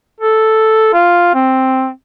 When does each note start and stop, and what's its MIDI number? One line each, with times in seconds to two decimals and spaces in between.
0.21 0.90 69
0.93 1.33 65
1.34 1.89 60